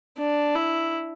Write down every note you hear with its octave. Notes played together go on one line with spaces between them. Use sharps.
D4
E4